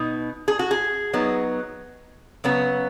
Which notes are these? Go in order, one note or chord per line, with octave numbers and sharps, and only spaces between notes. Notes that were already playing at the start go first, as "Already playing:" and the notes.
Already playing: B2 B3 D#4
G#4
F#4
G#4
F#3 B3 D#4
C#3 F#3 B3